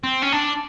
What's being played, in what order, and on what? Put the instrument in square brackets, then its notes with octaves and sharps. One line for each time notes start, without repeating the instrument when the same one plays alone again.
[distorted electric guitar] C4
C#4
D4